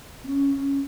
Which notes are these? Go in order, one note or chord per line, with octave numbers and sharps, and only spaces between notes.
C4
C#4
C#4